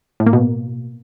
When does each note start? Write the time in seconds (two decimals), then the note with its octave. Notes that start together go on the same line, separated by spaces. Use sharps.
0.20 A2
0.27 A#3
0.33 B2